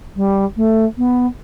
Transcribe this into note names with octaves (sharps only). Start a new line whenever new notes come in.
G3
A3
B3